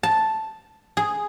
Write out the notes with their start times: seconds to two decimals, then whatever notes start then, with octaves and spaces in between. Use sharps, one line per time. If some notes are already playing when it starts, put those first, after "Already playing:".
0.03 A5
0.97 G#4